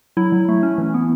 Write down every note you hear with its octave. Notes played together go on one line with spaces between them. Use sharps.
F#3 E4
F#3
A3
C#4
E3
B3